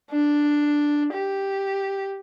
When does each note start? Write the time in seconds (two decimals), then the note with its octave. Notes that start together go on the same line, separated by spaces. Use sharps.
0.11 D4
1.13 G4